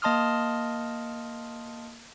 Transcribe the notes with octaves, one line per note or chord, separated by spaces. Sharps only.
A#3 D#5 A5 C6 D#6 F6